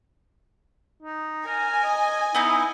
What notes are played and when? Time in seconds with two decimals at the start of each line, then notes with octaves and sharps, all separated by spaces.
1.03 D#4
1.46 A#4 G#5
1.84 D#5
2.35 B3 D#4 E4